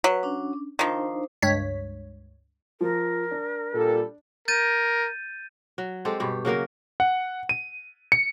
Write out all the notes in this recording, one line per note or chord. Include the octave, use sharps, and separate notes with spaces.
F#3 B4
C#4 D4
D#3 F3 D4 D#4 C5
C#2 G2 C#5 B6
F3 A#4
D4
A#2 G3 A4
A#4 G6 A6 D#7
F#3
G#3 C4 G4 A4
G2 B2 G4
C#3 F#3 A#3 A#4
F#5
D#7
C#7